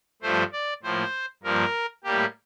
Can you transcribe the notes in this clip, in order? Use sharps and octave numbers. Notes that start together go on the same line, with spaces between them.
G2 F3 A3 C5
D5
A2 F3 A#3 C5
G2 F3 A#3 A#4
A2 G3 A#3 G4